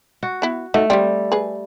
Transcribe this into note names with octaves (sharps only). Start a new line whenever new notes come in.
F#4
B3 E4
A3 D#4 F#4
G3 C4 G4
G#4 B4